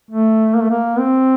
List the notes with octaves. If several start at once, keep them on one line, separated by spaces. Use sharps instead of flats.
A3
A#3
A3
A#3
C4